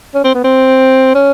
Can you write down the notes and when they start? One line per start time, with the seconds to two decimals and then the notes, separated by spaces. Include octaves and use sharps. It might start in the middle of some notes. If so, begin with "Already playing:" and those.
0.14 C#4
0.24 C4
0.35 B3
0.44 C4
1.15 C#4